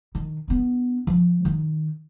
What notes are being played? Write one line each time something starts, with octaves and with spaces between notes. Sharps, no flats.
D#3
B3 D4
F3
D#3